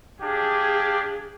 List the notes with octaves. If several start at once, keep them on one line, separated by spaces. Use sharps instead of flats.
D4 G4 G#4 F5